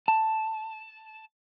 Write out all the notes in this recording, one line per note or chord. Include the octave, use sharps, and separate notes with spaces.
A5